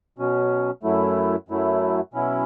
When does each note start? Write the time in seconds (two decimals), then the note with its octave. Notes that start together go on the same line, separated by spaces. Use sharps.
0.18 B2 F#3 C#4
0.83 F#2 F#3 A3 E4
1.48 F#2 F#3 A3 E4
2.13 B2 F#3 C#4 E4